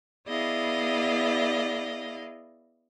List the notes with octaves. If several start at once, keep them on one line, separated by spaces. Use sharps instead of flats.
B3 E4 G#4 D5 D#5 F5